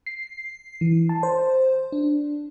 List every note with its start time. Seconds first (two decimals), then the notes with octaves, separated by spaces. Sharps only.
0.06 C7
0.81 E3
1.09 A5
1.23 C5
1.92 D4